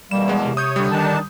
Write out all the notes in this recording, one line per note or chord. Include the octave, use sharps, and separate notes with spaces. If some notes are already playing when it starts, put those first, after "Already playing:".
E2 B2 G3 A#3 E7
G#3 B3
C3
C#5 D#6 G6
D3 G3
D#3 D4 D#4 A5